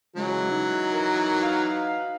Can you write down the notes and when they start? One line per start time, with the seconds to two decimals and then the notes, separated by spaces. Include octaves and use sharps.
0.17 C#3 E3 F#3 G#3
0.51 D#4
0.93 A#4
1.43 F#4 B4 F5